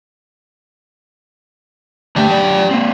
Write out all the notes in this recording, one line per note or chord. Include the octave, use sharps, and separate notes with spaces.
D2 A3 D4 G4
F#3 D5
A#3 C4